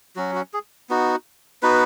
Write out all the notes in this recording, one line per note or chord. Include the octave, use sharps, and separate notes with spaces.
F#3 C#4 F#4
F#4
G#4
B3 D#4 F#4
B3 D#4 F#4 B4